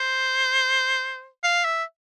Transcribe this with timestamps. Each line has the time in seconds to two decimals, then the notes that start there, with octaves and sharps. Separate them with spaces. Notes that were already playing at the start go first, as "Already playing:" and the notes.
Already playing: C5
1.44 F5
1.65 E5